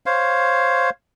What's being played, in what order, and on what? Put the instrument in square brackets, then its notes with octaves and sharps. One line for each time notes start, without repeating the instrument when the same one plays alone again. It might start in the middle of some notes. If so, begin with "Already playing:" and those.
[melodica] C5 C#5 F5